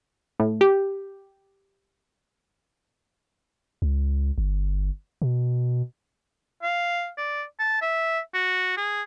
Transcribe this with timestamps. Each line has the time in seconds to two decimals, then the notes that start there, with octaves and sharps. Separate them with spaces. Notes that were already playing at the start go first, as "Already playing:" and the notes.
0.39 A2
0.61 G4
3.82 C#2
4.38 G1
5.22 B2
6.63 F5
7.17 D5
7.59 A5
7.82 E5
8.34 F#4
8.77 G#4